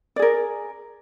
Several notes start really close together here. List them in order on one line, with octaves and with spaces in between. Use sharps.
D5 G#4 A#4